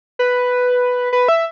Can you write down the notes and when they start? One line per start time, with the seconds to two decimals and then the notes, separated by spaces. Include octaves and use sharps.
0.19 B4
1.13 B4
1.28 E5